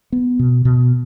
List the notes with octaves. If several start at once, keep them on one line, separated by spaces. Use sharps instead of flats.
B3
B2
B2